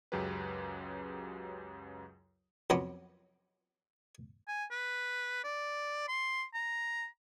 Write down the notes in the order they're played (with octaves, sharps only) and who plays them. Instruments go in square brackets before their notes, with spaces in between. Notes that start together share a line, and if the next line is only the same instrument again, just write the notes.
[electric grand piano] C#2 F#2 F#3 G4 G#4 B4
[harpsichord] F2 F#3 B3 C#4 D6
[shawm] G#5
B4
D5
C6
A#5